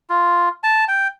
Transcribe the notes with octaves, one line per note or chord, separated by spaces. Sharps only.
F4
A5
G5